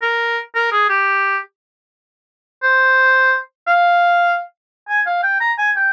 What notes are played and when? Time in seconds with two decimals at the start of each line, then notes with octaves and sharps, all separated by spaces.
0.02 A#4
0.55 A#4
0.72 G#4
0.89 G4
2.63 C5
3.67 F5
4.89 G#5
5.06 F5
5.23 G5
5.41 A#5
5.59 G#5
5.76 G5